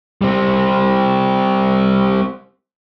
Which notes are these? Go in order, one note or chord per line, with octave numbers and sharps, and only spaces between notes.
G3 C4